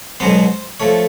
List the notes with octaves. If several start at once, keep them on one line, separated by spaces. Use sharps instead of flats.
C#2 B2 F#3 B3 C5
F3 A3 C#5